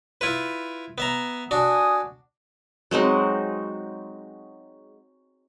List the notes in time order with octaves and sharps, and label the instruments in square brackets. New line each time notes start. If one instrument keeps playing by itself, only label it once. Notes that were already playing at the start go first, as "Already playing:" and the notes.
[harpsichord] E4 F4 B4
B3 E5 A#5
[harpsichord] D4 F#4 [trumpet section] G#5 D#6
[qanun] F#3 G#3 C4 D#4